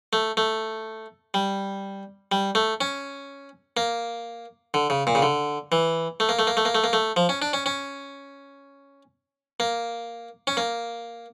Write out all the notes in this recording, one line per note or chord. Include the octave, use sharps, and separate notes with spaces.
A3
A3
G3
G3
A3
C#4
A#3
D3
C#3
A#2
C#3
D3
E3
A3
A#3
A3
A#3
A3
A#3
A3
A#3
A3
F3
C#4
D4
C#4
C#4
A#3
C#4
A#3